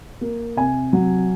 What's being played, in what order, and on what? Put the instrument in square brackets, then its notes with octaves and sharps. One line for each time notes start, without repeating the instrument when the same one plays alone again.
[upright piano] A#3
C3 G#5
F#3